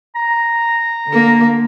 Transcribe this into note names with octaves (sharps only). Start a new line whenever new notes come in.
A#5
D3 A#3